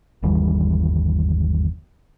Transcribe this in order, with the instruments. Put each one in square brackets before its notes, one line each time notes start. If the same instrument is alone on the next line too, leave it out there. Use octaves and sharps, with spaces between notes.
[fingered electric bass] G1 D#2 E3 G3